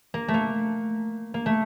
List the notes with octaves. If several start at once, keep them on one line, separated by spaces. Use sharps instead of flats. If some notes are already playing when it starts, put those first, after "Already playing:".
A#3
A3
A#3
A#3
A3